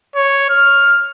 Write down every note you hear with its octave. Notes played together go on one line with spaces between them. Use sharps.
C#5
F6